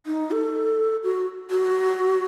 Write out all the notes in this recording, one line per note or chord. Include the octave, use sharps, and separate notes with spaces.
D#4
A4
F#4
F#4